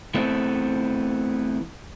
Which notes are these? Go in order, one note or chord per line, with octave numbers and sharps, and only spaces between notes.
E3 A3 B3 C4